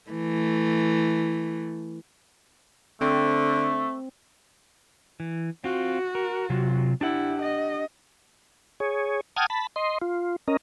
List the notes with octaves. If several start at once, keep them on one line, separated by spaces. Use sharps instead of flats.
E3 A3
D3 A3 C4
E3
C4 F4 F#4
A#4
C3 F#3 F4
D4 E4 G4 F#5
D#5
G#4 C#5
F#5 G5 A5 D#6 F6 G#6
A5 B5
D#5 C6
F4
C#4 A#4 D#5